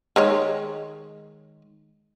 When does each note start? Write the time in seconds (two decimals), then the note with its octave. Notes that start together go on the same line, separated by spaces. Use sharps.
0.16 D#3 G#3 C#5